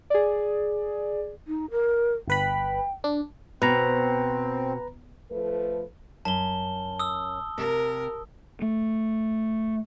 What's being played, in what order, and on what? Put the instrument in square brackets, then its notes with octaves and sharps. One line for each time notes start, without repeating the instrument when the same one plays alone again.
[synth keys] G#4 D5
[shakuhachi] D#4
A#4
[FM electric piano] G1 B4 B5 [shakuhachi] G5
[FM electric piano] D4
[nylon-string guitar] B2 [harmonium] C4 [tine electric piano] B4 A#5
[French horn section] F3 A3 A4 B4
[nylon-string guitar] F#2 [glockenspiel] A5 G7
[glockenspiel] D#6 E6
[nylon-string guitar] C3 [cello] A#4
[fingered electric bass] A3